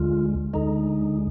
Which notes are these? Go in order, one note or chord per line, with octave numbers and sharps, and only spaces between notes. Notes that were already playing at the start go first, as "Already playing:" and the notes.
Already playing: D2 D3 G#3 F4
D2 D3 G#3 D#4